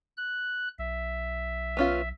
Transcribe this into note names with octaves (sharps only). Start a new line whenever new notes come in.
F#6
B1 E5
B3 C#4 F4